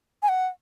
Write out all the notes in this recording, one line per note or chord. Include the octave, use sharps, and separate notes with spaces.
G#5
F#5